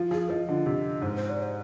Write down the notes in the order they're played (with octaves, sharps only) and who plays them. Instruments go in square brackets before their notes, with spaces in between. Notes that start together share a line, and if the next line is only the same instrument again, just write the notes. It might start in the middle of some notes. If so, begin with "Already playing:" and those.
Already playing: [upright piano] F3
[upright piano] F3 [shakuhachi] G#4
[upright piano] F3 [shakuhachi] D#5
[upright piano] D3
C3
[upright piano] G#2 [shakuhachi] C5
[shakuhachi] C5
D5
C5